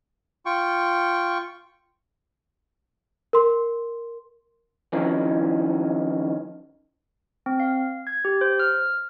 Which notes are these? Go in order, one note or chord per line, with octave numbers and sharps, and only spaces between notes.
F4 G5 C#6
A#4 C6
D#3 F3 F#3 C#4 E4
C4
F5
G#6
G4
C5
F6